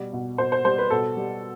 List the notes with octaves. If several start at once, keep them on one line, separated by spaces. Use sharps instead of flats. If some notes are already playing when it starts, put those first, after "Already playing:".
Already playing: B2 G3
B2
B2 C5
C5
G3 C5
B4
B2 A4
G3